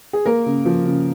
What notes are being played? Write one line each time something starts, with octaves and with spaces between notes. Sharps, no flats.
G#4
A#3 A#4
C#3
F3
C#3